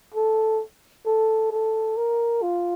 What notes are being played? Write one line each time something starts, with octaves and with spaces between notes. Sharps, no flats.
A4
A4
A4
A#4
F4